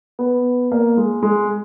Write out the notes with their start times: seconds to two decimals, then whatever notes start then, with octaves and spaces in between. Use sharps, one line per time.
0.19 B3
0.72 A#3
0.97 G#3
1.23 G#3